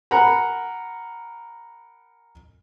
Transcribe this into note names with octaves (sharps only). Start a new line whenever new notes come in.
A#4 F#5 G#5 A#5 B5